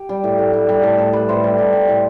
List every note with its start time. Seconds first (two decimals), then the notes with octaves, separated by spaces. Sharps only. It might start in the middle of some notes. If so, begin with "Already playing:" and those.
Already playing: G4
0.09 G3
0.24 A2
0.38 A2
0.53 G3
0.69 G3
0.83 A2 A4
0.98 A2 A4
1.13 G3 B4
1.28 A2 C5
1.44 G3
1.58 G3
1.73 G3
1.88 A2